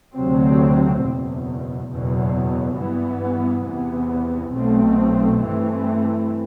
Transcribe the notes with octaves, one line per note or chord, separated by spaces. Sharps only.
D2 C3 F#3 C4
F#1 E2 B2
F#1 E2 B2 F#3
G2 E3 B3
E2 C3 E3 B3
B1 B2 A3 C4
G2 E3 A3 C4